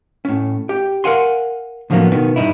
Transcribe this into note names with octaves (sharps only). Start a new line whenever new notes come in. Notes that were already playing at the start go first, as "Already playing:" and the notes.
A2 C#4
G4 G5
A#4 F5 F#5 G#5 C6
A2 D3 F3 F#3 A#3 B3
B2 D#3 B3
G2 D#4 E4